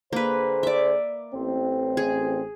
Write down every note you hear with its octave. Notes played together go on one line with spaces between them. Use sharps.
D3 A#3 G#4 B4 C5
D5 E5
A1 C4
G#4